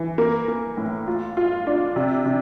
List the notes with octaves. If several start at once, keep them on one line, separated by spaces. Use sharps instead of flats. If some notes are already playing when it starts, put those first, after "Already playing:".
Already playing: E3
A#3
A#3
A2
F4
F4
D4
C3
C3